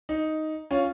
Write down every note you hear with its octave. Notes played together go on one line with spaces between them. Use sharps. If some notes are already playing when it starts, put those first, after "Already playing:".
D#4
C#4 F4